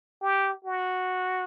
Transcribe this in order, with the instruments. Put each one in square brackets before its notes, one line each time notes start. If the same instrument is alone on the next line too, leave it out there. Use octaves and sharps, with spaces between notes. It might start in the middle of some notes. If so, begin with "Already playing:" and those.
[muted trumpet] G4
F#4